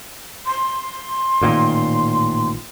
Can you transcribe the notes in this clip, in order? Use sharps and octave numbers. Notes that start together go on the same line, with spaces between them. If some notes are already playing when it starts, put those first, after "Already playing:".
C6
A1 A#2 D#3